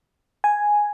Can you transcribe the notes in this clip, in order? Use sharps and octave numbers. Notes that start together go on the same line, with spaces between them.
G#5